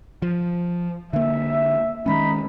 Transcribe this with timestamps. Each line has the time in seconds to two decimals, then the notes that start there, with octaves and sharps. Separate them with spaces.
0.22 F3
1.13 D3 A#3 E5
2.06 D#3 G#3 C#4 D#4 B5